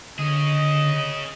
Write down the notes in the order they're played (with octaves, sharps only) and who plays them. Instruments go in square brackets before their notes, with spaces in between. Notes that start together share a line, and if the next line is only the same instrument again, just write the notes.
[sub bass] D3 [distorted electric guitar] C#4 G#4 [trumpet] D#5